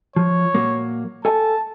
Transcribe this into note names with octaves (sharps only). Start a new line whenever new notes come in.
F3 C#5
A#2 F#3 A#3
A4 G#5 A5